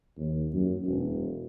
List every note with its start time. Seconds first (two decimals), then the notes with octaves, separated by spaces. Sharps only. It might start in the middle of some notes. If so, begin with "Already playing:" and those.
0.18 D#2
0.53 F#2
0.86 E1